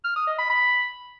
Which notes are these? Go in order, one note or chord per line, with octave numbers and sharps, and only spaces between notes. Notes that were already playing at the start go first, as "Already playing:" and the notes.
F6
D#6
D#5
B5
B5